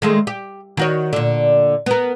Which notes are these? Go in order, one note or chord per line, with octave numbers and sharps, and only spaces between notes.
D#3 G#3 A3
G4
D#3 F#4 C#5
A#2 D3
B3 A#4